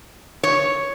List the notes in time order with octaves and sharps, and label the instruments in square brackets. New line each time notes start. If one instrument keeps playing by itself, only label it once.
[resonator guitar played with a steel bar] C#5